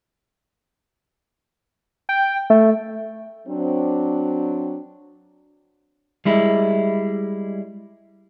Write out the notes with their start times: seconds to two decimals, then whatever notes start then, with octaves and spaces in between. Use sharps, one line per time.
2.09 G5
2.50 A3
3.48 F#3 C4 D4
6.25 G3 G#3 E4